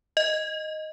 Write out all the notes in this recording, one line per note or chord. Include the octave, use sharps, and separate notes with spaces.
D#5